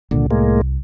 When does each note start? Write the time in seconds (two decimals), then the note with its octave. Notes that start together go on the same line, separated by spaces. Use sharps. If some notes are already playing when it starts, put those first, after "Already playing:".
0.11 C2 A#2 D3
0.31 A2 G#3 A#3